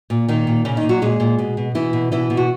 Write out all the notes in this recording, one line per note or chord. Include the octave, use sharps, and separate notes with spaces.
A#2
A#2 D#3 D#4
A#2
A#2 C#3 C#4
D#3 D#4
A#2
F#3 F#4
A#2 G#3 G#4
A#2
B2
B2
B2 E3 E4
B2
B2 E3 E4
B2
F#4